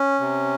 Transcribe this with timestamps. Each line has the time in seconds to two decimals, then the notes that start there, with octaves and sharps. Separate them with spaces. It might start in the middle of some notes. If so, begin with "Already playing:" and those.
Already playing: C#4
0.20 C3